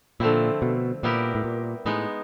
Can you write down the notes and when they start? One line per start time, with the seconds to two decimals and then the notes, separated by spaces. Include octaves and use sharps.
0.20 A#2 D3 F3 A3 C4 E4
0.62 B2
1.03 A#2 G3 B3 E4 G4 A#4
1.35 A2
1.44 A#2
1.85 A2 G#3 B3 D#4